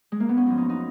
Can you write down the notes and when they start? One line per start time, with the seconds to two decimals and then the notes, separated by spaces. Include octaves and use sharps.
0.12 G#3
0.20 A#3
0.29 B3
0.37 C#4
0.46 F#2 F3 D#4
0.58 D#4
0.70 D#4